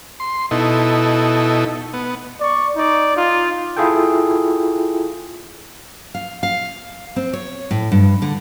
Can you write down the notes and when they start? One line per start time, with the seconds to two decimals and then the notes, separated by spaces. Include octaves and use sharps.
0.20 C6
0.51 B2 D#4 E4 A4
1.94 B3
2.40 D5 C#6
2.76 D#4 D5
3.14 D#4 F4
3.77 E4 F4 G#4 A4 G5
6.14 F5
6.43 F5
7.16 C4
7.33 C#5
7.71 A2
7.92 G2
8.22 D3